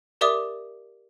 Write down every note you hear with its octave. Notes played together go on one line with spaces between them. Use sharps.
G4 A#4 D5 E5 D6 D#6